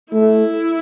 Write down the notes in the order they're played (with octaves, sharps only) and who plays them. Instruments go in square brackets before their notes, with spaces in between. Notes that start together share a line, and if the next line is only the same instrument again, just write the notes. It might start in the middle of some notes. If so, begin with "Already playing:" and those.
[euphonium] A3 [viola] E4